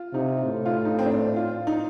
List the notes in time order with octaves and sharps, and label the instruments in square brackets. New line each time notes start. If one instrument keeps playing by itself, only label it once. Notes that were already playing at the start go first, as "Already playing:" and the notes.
Already playing: [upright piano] F4
[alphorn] C3 [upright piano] D#4
[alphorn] A2
[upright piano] F4
D#4
C4
D4
F4
D#4